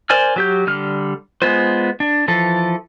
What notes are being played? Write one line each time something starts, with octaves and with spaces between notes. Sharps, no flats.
A#4 C5 D5 G#5 F6
F#3 G4 G6
D3 G3 F6
G#3 B3 F4 C5
D4
E3 F3 A4